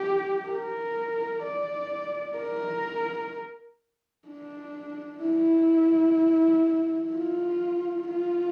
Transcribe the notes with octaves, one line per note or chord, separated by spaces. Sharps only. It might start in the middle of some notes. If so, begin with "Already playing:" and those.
Already playing: G4
A#4
D5
A#4
D4
E4
F4
F4